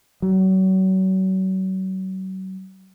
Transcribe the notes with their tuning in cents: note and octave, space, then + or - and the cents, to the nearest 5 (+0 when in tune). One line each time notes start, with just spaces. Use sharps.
F#3 +35